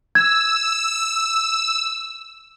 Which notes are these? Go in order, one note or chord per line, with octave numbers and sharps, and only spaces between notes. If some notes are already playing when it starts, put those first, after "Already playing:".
E6 G#6